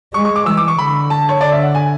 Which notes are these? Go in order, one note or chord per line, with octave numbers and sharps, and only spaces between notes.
G#3 C#6
C#6
D6
E3 E6
D6
C#6
D3 B5
A5
C#5
D3 D5
E5
F#5
G#5